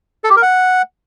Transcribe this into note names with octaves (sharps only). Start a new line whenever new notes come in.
A4
G4
A#4
F#5